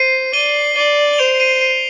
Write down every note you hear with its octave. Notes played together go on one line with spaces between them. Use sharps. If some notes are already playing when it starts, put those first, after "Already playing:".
Already playing: C5 C7 D#7
D5 D#7 G7
D5 D#7 G7
G7
C5 D7 F7
C7 D#7
C7 D#7